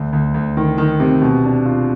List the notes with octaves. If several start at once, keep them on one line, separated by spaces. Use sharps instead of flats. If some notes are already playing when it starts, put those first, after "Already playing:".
Already playing: D2
D2
D2
D#3
D#3
C3
B2
D4
F4